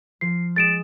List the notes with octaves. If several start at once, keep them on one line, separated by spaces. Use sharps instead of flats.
F3 F4 C7
G#3 D#6 A6 D7 E7